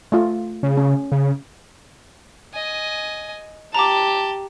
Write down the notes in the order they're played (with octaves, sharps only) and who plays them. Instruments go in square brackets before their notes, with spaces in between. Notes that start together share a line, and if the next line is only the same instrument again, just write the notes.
[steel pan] A3 F4
[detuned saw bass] C#3
[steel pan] C#4
[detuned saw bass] C#3
[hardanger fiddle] D#5 G#5
[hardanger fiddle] G4 [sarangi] A5 [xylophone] A#5 D6